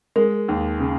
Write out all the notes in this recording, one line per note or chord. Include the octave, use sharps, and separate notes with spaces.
G#3 A#4
D#2
C#3